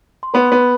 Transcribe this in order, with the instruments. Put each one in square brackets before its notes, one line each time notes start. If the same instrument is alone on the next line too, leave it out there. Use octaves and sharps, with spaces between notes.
[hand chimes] C6
[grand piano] B3 [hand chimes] B4 B5
[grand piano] B3